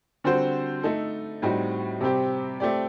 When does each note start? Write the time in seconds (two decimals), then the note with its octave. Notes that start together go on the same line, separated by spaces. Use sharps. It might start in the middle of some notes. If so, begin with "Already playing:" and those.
0.24 D3 G3 C4 F#4 C5
0.83 A3 D#4 A4
1.42 A2 G3 C4 D#4 F#4
2.01 C3 G3 C4 G4
2.60 A3 C4 G4 D5